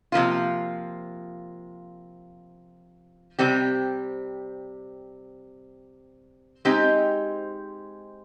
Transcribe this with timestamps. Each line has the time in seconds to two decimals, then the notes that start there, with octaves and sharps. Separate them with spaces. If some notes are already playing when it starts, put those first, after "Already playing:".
0.12 C3 F3 A#3 F4
3.39 C3 G3 C4 G4
6.65 G#3 C4 D#4 G4